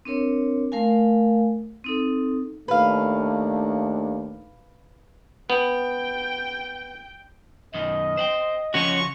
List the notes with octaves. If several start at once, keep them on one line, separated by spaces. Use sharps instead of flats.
C4 D4 A#4 C#5
A3 A#4 F5 G#5
C4 D#4 A4
D#2 A3 D4 B4 F5
B3 G5
F#2 B2 D#3 D#5
C5 F#5 G5
C#3 F3 C#4 F#4 C#5 C#6